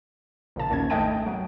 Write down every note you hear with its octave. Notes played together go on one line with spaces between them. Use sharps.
A#1 A#2 C#3 A5
A#1 D#2 C#4 G#6
G#1 A3 D#5 G5 A5 D7
F#3